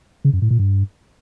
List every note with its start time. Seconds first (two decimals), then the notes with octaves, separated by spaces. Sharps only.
0.25 C#3
0.33 F#2
0.42 A2
0.51 A#2
0.59 G2